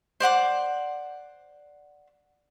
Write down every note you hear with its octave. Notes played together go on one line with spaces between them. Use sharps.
C5 D5 F#5 D6